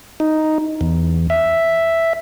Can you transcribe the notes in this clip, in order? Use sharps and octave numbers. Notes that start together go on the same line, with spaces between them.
D#4
E2
E5